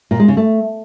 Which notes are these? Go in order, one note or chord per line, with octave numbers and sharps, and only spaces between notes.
A#2
G#3
C#3
A3